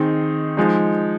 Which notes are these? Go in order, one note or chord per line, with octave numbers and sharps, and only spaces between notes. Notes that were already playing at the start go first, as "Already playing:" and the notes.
Already playing: D#3 C4 D#4 G#4
F3 G#3 D#4